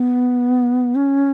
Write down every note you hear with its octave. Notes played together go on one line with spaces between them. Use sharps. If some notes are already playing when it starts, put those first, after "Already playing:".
Already playing: B3
C#4